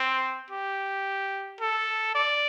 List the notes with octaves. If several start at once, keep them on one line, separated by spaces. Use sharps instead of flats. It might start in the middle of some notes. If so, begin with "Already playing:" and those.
Already playing: C4
G4
A4
D5